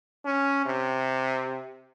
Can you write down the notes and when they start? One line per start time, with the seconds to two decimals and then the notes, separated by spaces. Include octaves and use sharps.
0.25 C#4
0.65 C3